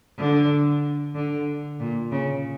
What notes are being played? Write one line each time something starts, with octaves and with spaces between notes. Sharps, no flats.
D3
D3
A#2
C#3